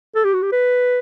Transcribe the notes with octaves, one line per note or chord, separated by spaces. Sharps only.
A4
G4
F#4
G4
B4